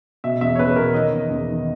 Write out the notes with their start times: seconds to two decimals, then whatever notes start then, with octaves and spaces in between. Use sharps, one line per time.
0.24 B2 E5
0.41 E2 E5
0.55 C#5
0.58 E2 B4
0.76 B2 A#4
0.94 D#3 D#5
1.12 E2
1.30 E2
1.48 D#3